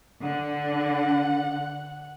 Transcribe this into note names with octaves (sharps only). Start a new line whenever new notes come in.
D3 F#5